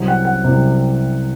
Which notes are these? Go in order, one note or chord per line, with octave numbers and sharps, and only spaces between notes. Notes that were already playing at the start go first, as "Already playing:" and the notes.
Already playing: C2 C3 F#3
F#5
F#5
C2 C3 F#3